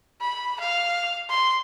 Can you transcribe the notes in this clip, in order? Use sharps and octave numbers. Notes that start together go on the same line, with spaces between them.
B5
F5
C6